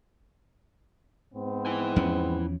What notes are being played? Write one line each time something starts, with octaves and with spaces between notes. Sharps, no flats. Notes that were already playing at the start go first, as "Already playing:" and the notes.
G#2 B3 C4
E4 G#5
E2 F3 C#4